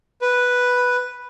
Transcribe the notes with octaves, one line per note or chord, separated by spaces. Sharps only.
B4